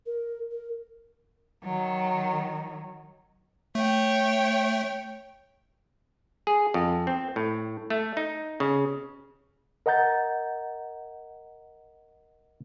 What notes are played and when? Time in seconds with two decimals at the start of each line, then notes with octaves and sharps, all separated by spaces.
0.06 A#4
0.51 A#4
1.64 D#3 F#3
3.75 A3 C#5 G5
6.47 G#4
6.74 F2
7.07 C4
7.36 A2
7.90 A3
8.17 D#4
8.60 C#3
9.86 A#4 D#5 F#5 A#5 G6 A6